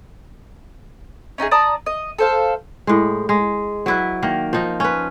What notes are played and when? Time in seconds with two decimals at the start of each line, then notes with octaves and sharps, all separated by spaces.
1.38 C#4 D#4 F4 G#4
1.51 D5 A5 A#5 D#6
1.86 D#5
2.19 A4 C5 F5
2.87 A2 G#3
3.29 G#3
3.86 F#3 E4 B4
4.23 D#3 A#3
4.53 F3 D#4
4.80 C#4 B4